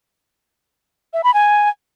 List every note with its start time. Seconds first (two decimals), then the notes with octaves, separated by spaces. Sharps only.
1.13 E5
1.24 B5
1.34 G#5